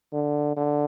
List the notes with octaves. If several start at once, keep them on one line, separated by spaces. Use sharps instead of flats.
D3
D3